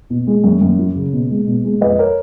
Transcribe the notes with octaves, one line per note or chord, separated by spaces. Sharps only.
B2
G#3
F#2
F#2
F#3
C#3
B2
G#3
B2
G#3
F2 B4 D#5
A#4 C#5